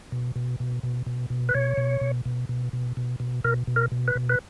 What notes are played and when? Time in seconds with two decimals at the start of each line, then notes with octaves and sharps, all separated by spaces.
0.12 B2
0.36 B2
0.60 B2
0.83 B2
1.06 B2
1.30 B2
1.49 B4
1.55 B2 C#5
1.77 B2
2.01 B2
2.25 B2
2.49 B2
2.73 B2
2.97 B2
3.20 B2
3.44 B2 A#4
3.67 B2
3.76 A#4
3.92 B2
4.08 B4
4.15 B2
4.29 B4